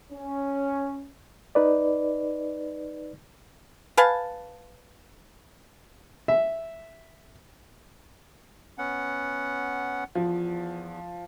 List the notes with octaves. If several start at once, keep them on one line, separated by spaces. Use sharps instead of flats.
C#4
D#4 B4 D5
B4 F5 G#5 A5
E5
B3 C#4 F#5
E2 F3